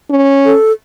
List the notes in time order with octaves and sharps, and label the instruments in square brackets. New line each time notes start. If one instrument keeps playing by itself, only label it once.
[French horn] C#4
[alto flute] A4